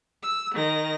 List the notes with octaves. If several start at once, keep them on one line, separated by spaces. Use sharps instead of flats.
E6
D#3 A#6